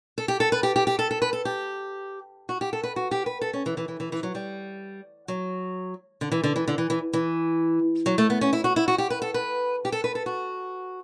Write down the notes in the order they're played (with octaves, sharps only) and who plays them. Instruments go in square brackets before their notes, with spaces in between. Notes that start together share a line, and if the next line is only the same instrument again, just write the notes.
[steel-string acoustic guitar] A4
G4
A4
B4
G4
G4
G4
A4
A4
B4
A4
G4
F#4
G4
A4
B4
F#4
G4
B4
A4
C#4
E3
E3
E3
E3
E3
F#3
G3
F#3
D3
E3
D3
E3
D3
E3
E3
E3
F#3
A3
B3
C#4
E4
F#4
E4
F#4
G4
B4
A4
B4
G4
A4
B4
A4
F#4